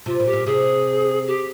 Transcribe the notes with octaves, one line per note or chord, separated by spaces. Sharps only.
C3 F4
A#2
G4
A#2
C3 G#4
G4